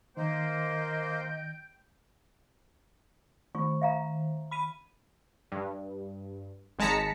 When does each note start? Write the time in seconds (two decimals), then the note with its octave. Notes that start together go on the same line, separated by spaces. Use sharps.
0.17 D#3 A#3 C5 D#5 G5
3.55 D#3 F4 C#6
3.82 E5 F5 A#5
4.51 B5 B6 D#7
5.52 G2
6.79 G#1 G#3 A5 A#5 B6 C#7